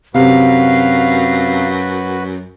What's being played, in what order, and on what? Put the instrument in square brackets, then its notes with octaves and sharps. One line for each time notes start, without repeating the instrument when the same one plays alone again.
[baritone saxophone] F#2 [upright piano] C3 [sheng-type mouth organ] F#4 B4 [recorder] F5